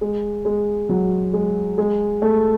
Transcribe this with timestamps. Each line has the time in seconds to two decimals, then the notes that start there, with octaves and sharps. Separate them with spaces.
0.01 G#3
0.45 G#3
0.89 F#3
1.34 G#3
1.78 G#3
2.22 A3